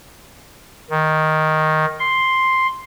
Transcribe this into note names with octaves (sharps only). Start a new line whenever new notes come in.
D#3
C6